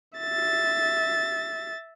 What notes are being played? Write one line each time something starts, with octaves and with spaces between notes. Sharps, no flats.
E5 A6